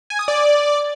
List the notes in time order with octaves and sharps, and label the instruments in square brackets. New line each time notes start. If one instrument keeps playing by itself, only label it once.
[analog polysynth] G#5
D#6
D5